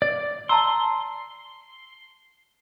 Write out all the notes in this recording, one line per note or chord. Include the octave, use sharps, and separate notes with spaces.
D5
A5 A#5 C6 E6